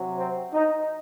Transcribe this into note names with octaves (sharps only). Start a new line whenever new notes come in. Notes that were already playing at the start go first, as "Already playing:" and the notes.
Already playing: C3 F#3
C4
D#4